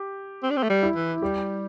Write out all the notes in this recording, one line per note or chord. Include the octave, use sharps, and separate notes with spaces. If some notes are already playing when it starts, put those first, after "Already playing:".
Already playing: G4
C4
D4
C4
A3
G3
E4
E3
G3 G4